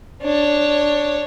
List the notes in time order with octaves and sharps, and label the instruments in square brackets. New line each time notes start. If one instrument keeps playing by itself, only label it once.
[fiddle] D4 C#5